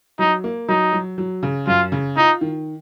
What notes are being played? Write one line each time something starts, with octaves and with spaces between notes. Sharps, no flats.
F#3 D#4
A#3
F#3 D#4
F#3
F#3
C#3
F#2 F4
C#3
D#4 F4
D#3